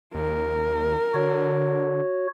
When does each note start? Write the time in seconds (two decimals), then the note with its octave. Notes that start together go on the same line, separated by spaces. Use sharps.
0.14 D#2 A#4
1.14 D3 F#4 C#5